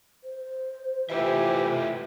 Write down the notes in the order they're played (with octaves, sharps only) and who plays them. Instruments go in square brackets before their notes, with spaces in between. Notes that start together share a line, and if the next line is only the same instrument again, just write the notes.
[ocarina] C5
[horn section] E3 [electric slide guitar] A3 F4 E5 [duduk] G4